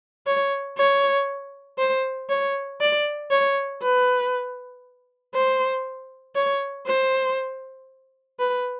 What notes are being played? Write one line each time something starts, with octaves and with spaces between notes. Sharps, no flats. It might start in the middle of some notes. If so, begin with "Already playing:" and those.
C#5
C#5
C5
C#5
D5
C#5
B4
C5
C#5
C5
B4